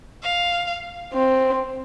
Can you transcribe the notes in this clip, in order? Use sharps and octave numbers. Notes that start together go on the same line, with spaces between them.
F5
C4